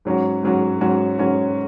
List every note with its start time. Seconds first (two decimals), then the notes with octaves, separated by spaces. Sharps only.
0.05 G#2 F#3 C#4 F#4
0.43 G#2 F#3 C#4 F#4
0.80 G#2 F#3 C#4 F#4
1.19 G#2 F#3 C#4 F#4